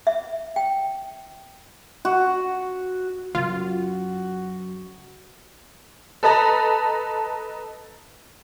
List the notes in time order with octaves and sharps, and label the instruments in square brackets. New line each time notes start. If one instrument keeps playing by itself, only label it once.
[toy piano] E5
G5
[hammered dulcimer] F#4
[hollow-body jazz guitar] C#2 F#2 [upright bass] C#3 [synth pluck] F4 [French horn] F#4
[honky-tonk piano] A4 B4 D#5 A5 A#5